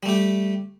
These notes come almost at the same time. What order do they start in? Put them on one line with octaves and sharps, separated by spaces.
G3 A3 G4